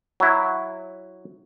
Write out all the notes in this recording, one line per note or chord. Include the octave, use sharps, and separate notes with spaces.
F#3 E4